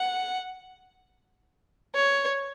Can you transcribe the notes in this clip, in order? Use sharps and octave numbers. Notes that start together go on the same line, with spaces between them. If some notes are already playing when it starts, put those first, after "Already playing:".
Already playing: F#5
C#5